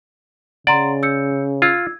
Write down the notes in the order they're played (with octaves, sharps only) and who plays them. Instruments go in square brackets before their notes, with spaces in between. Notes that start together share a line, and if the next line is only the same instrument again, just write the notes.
[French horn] C#3 [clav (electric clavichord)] D5 [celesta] F#5 A#5 C6
[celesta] E6 G6 C#7
[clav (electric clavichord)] F4 [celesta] E6 G#6